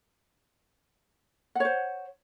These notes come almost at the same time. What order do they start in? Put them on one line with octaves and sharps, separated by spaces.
F#5 C#5 C5